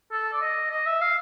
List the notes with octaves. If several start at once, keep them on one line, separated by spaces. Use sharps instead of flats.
A4
D5
D#5
D#5
E5
F5